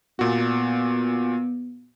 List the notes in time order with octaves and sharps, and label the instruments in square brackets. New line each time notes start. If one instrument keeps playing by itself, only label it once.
[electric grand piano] A#2 F#4 [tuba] B3